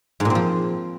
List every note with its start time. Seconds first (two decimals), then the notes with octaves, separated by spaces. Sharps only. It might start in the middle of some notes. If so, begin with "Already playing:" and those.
0.20 G#2
0.25 A#2
0.30 C4
0.35 F3